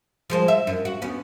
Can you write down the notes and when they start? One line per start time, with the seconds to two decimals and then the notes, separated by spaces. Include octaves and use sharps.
0.30 F3 G#3 C5
0.48 E5
0.67 F#2
0.85 F#4
1.02 D2 B3 C#4